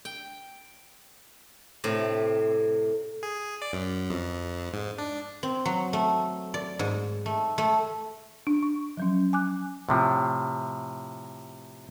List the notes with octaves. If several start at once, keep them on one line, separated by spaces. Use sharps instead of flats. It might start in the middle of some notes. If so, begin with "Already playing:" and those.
G5
A2 C3
G#4
D5
F#2
F2
G#2
D4
C4
F#3
A3
D5
G#2
A3
A3
D4
C#6
F3 F#3 C#4
G#5 D6 F#6
A2 C3 F3